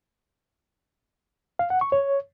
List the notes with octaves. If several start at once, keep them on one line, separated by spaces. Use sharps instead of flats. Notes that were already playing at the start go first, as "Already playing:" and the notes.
F5
F#5
C#6
C#5